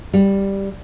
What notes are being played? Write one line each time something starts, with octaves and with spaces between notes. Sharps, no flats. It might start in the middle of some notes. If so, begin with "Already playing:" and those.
G3